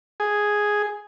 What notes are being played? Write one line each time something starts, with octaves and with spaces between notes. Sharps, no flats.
G#4